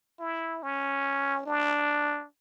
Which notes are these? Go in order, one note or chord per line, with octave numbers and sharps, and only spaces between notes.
E4
C#4
D4